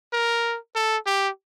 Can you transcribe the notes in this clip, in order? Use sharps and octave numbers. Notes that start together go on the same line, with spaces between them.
A#4
A4
G4